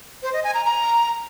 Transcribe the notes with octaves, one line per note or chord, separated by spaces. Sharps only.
C5
D#5
G#5
A#5
A#5